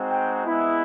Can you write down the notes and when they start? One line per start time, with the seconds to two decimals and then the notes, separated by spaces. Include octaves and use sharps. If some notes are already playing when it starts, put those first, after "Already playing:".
Already playing: G#3 C4 D#4 F#4
0.11 G5
0.45 G#3 B3 E4